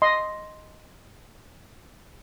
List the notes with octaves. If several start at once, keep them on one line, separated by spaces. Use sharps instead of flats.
D#5 C6